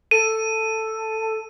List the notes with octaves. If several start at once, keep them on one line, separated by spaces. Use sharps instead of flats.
A4 D#7